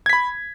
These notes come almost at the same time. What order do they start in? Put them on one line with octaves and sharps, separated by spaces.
G#6 B6 B5